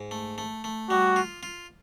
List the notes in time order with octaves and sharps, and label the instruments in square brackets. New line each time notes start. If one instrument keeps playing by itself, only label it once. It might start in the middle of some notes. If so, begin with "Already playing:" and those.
Already playing: [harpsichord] G#2
A3
A3
A3
[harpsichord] G3 [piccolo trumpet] F#4
[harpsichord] F4
F4